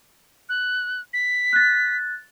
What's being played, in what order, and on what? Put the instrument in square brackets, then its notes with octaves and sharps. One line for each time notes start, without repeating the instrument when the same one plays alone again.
[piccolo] F#6
B6
[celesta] F#6 A6